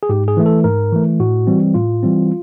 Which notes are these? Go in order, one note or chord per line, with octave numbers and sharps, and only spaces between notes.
G#4
G#2 G4
G#4
E3 A3
A4
G#2 A#4
E3 A3
A2 F#4
E3 G3 C4
A2 F4
E3 G3 C4